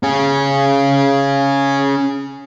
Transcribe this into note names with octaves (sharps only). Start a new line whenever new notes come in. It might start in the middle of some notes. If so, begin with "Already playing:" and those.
C#4 G#4